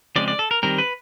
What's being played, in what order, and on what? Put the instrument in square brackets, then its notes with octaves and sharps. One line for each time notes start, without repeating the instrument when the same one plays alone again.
[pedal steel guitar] C#3 F3 G#3 C4 D5
D5
A4
A#4
D#3 G3 C4 A#4
B4